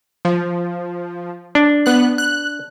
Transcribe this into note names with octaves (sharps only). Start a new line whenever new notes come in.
F3
D4
B3 F#6
F#6